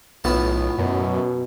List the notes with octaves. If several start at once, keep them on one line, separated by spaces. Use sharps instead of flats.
B1 A2 B3 F4 A5
F#2 B2 F#4